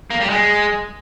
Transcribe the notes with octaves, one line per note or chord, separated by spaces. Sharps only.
A#3
G3
G#3